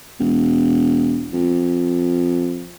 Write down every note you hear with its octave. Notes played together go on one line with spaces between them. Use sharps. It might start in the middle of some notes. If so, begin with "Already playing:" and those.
E1
F2